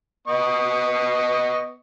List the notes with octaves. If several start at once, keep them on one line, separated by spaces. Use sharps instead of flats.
B3 D#5 C#6